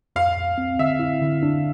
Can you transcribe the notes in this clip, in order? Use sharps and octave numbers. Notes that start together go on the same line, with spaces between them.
F2 F5
F2
C4
D3 E5
E4
D3
D4